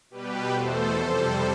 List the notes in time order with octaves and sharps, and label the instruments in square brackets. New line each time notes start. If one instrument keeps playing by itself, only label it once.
[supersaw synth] B2 G3 G4 B4
E2 B2 A3 A4 C5
F2 C3 G3 A4 C5